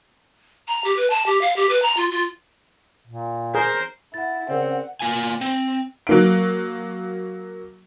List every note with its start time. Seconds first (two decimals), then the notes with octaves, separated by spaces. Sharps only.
0.68 A#5
0.84 G4
0.96 B4
1.10 A5
1.26 G4
1.41 F5
1.56 G4
1.69 B4
1.82 A#5
1.97 F4
2.11 F4
3.07 A#2
3.55 G#4 A#4 C5
4.14 E4 F#5 A6
4.50 C#3 C4 A#4 D5 F#5
5.01 A#3 F4 G#5
5.41 C4
6.07 F#3 A#3 D7